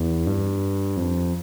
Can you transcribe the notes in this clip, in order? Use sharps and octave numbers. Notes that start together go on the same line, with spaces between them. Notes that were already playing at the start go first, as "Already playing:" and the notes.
Already playing: E2
G2
F2